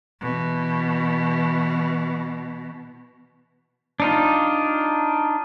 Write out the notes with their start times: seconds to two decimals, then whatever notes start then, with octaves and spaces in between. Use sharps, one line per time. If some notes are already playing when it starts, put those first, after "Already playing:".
0.21 B2 E3
4.00 D4 D#4 F4